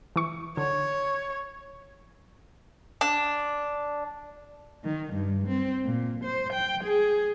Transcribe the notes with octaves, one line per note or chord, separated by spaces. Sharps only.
E3 C#6
D3 C#5
D4
D#3
G2
C4
A#2
C5
G5
G#4